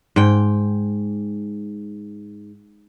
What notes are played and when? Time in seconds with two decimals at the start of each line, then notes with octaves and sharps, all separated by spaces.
0.16 G#2 G5